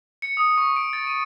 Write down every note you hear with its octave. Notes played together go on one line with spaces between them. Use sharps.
C#7
D#6
C#6
D7
A6
D#7